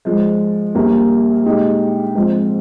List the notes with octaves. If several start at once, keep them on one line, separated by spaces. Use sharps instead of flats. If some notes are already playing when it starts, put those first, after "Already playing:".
G#2 F3 G#3
A#1 A#2 G3 A#3
A#2 G#3 D#4 G4
G#2 F3 C4